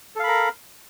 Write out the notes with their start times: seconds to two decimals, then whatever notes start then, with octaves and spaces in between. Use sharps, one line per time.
0.16 A4
0.20 F5
0.24 B5
0.27 A#4